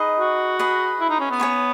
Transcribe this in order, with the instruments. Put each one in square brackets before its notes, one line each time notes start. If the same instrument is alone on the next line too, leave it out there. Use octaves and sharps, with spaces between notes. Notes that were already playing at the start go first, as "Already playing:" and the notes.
Already playing: [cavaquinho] D#4 G#4 B4 D#5
[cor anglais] F#4
[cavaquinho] G#4 B4 D#5
[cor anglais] E4
D#4
C#4
B3
[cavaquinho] C#5 G#5 C#6